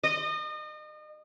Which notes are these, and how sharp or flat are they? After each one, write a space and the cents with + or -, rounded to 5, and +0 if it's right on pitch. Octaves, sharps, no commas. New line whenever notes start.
D#5 -35